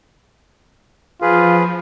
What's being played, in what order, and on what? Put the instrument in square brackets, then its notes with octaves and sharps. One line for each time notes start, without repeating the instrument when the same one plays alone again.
[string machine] F3 [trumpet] F4 [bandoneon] G#4 B4